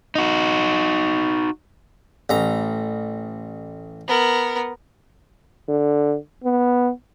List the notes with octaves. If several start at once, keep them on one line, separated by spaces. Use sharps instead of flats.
D#4 F#4
A1 A#5
B3 A#4
D3
B3